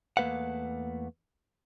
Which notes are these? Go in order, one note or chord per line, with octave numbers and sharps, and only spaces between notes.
E2 A3 A#3 B4 F5 F#5